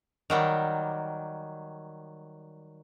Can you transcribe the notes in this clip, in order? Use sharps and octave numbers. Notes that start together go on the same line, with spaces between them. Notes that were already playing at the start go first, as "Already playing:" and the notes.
D#3 F#3 G3